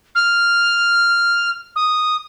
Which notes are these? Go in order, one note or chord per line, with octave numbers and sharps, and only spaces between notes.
F6
D#6